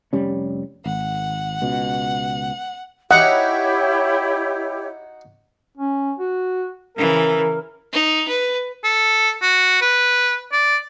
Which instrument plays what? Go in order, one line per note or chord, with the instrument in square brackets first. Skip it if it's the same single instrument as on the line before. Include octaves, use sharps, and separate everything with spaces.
[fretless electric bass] F1 G3 C#4
[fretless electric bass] G#1 [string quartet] F#5
[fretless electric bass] C#2 B2
[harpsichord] D#4 F#4 A#5 [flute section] E4 G4 C#5 [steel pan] F#5
[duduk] C#4
F#4
[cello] C#3 E3 [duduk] A#4
[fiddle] D#4
B4
[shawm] A4
F#4
B4
D5